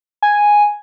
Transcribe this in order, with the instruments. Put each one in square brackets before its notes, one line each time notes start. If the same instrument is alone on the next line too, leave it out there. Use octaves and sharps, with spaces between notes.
[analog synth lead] G#5